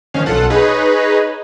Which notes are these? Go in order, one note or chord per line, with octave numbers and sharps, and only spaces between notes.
D#3 F3 C#4 F5
B1 F4 A4 F#5
D#4 G#4 B4 C#5 D#5